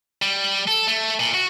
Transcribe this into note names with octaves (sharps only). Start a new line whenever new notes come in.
G3
A4
A3
A#2
F#4